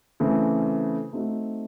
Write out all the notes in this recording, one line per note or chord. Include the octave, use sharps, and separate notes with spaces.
C#3 E3 A3 C4
A3 C4 D#4 F#4